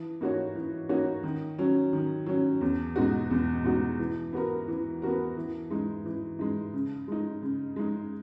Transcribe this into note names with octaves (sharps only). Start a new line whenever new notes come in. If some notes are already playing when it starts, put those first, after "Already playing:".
Already playing: E3
A#3 D#4 F#4 C#5
E3
A#3 D#4 F#4 C#5
D#3
F#3 C#4
D#3
F#3 C#4
E2
B2 G#3 D#4 F#4
E2
B2 G#3 D#4 F#4
E3
B3 F#4 A#4
E3
B3 F#4 A#4
E3
G#3 D#4
E3
G#3 D#4
C#3
G#3 D#4
C#3
G#3 D#4